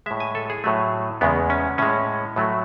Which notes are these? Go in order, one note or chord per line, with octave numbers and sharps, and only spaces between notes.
A2 G#3 E5
G#5
A4
G#4
A2 F#3 A3
E2 C#3 G#3 B3
C#4
A2 G#3 C#4
A2 F#3 A3